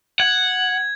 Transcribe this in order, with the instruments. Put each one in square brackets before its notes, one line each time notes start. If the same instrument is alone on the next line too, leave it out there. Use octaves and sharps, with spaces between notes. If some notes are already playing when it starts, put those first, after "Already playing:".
[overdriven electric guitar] F#5 [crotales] G#6